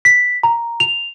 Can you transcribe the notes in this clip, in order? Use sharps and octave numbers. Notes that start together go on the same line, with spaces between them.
B6
A#5
F7